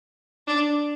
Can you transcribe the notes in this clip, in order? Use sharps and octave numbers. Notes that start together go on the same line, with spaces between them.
D4